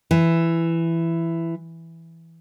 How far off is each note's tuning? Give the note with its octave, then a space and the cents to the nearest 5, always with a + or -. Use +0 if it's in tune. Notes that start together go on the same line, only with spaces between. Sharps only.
E3 +10